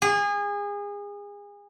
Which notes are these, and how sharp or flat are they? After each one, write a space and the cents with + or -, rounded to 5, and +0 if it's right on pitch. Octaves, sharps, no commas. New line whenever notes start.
G#4 -30